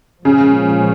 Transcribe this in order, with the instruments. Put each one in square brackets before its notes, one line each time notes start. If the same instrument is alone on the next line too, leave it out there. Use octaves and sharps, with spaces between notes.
[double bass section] A#2 F3 G#3 C#4 [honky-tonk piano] C#3